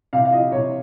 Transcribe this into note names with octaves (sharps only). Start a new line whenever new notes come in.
C3 F5
F5
F3 D#5
C3 C#5